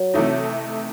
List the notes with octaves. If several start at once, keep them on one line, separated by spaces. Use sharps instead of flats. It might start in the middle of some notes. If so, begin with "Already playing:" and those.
Already playing: F#3
C3 E3 A3 D#4